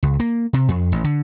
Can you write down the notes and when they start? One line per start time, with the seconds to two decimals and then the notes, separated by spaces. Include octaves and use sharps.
0.03 C#2
0.20 A#3
0.53 C3
0.68 F2
0.92 A1
1.04 D3